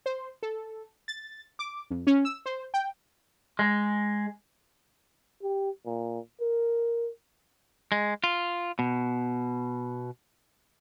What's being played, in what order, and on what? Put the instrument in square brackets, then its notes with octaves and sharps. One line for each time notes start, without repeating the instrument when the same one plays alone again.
[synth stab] C5
A4
A6
D6
F2
C#4
E6
C5
G5
[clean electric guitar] G#3
[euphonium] G4
A#2
A#4
[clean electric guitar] G#3
F4
B2